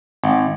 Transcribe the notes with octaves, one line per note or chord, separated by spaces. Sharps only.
G#1